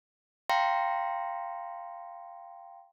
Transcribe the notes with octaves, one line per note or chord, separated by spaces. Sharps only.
F5 G5 A#5 C6 A#6 C#7